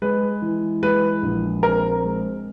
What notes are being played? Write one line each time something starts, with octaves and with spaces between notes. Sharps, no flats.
G#3 B4
E3
G#3 B4
A#1
C4 A#4
G#3